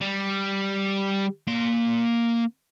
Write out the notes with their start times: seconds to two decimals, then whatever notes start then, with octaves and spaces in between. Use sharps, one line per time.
0.01 G3
1.47 A#3 C6